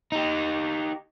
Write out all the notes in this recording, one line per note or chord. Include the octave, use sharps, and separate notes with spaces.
D#4 G4